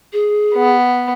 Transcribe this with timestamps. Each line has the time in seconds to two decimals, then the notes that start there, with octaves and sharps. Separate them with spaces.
0.13 G#4
0.55 B3